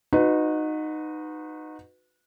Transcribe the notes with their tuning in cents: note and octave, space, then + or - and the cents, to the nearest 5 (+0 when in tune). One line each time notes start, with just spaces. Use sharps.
D#4 -10 F#4 -25 B4 +20